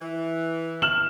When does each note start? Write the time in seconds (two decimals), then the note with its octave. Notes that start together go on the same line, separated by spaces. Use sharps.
0.01 E3
0.82 F6 E7 F#7